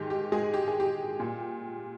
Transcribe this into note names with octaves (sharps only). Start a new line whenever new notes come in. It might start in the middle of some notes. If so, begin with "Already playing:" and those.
Already playing: G#2 D#3 G3 G4
G4
G#3 G#4
G4
G#4
G4
A#2 G3